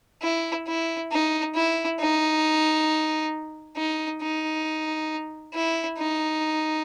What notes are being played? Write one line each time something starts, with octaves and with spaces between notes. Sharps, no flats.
E4
E4
D#4
E4
D#4
D#4
D#4
E4
D#4